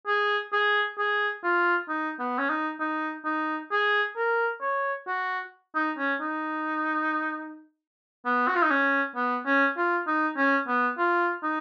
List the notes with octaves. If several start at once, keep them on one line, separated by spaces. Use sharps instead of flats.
G#4
G#4
G#4
F4
D#4
B3
C#4
D#4
D#4
D#4
G#4
A#4
C#5
F#4
D#4
C#4
D#4
B3
F#4
F4
D#4
C#4
B3
C#4
F4
D#4
C#4
B3
F4
D#4